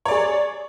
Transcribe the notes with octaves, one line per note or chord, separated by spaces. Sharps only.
G#4 C#5 D5